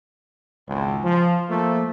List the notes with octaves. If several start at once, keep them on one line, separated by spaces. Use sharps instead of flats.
G#1 C#2
F3
F3 A3 A#3